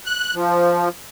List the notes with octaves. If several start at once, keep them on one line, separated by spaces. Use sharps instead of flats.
F#6
F3